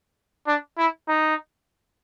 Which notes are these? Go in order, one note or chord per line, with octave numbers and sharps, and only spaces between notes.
D4
E4
D#4